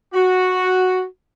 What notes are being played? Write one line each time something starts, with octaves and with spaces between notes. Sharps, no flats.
F#4